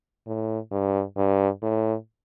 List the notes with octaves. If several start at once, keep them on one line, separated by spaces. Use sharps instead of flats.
A2
G2
G2
A2